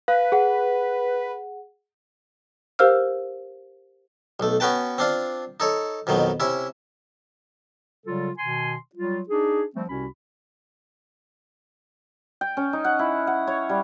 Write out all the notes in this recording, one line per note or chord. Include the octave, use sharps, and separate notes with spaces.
B4 F5
G#4 F#5
G4 A#4 C5 F5 E6 F6
B1 A3
B3 C#4 F#4 B4 G5 A5
C4 D4 F4
D#4 A4 C#5
F2 B2 D#3 F#3
C3 C#4 E4
C#3 F#3 G3 F4 A4
B2 D#3 G#5 C6
F#3 G3 F4
D4 D#4 G#4
F3 G3 A3 C4
C2 C3 C#4 F#4 B5
G5
C#4
D#4
F#5
E4
F#5
C#5
G3